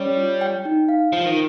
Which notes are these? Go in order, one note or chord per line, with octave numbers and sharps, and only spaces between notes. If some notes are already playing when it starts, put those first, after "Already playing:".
Already playing: G3 C#4 C#5
F4
G5
D#4
F5
F3 F4
D#3